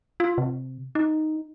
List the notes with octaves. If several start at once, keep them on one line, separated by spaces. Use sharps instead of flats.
F4
C3
D#4